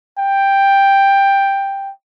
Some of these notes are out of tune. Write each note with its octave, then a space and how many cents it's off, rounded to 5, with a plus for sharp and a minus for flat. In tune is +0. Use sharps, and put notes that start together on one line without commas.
G5 +5